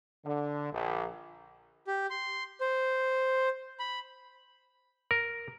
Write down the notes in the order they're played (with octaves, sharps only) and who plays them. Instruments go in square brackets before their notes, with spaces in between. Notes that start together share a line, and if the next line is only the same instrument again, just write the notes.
[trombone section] D3
A#1
[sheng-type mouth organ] G4
C6
C5
B5
[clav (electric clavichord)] A#4